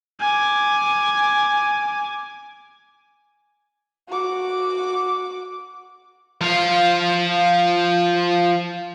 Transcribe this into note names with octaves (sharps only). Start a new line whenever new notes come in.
G#5 D6
F#4 D6
F3 F5